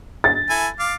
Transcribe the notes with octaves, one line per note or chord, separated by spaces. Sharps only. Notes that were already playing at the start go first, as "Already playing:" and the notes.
A6
E4 A4 G#5
F5 D6